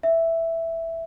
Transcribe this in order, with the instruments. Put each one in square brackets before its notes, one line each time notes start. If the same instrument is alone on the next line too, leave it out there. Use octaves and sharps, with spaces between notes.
[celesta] E5